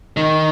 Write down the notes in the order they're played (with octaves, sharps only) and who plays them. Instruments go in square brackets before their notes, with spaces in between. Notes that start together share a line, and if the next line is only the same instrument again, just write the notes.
[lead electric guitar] D#3